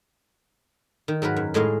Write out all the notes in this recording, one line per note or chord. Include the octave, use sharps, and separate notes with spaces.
D#3
G#2 F#3 A#4 B4
F#2
A2 G#3 D#5 F5